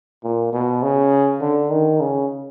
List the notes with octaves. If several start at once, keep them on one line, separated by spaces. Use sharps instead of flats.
A#2
B2
C#3
D3
D#3
C#3